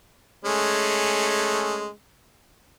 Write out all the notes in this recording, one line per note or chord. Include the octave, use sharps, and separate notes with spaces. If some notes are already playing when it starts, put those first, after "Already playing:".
G#3 A3 C#4